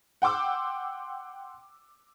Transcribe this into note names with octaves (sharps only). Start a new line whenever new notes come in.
F#5 G5 C6 D6 E6